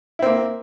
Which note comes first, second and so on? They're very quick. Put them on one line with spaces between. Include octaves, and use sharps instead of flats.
E4 C4 A#3